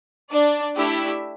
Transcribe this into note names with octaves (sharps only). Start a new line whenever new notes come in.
D4 D5
A3 D4 E4 G4 E5